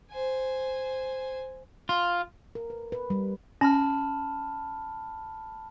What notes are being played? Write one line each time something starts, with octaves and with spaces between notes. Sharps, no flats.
C5 G#5
F4
A#4
B4
B4
G3
C#4 A5 B5 F6